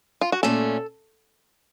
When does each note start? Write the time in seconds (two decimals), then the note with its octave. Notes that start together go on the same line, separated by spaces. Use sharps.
0.21 F4
0.32 F#4
0.43 A#2 A3 C#4 A4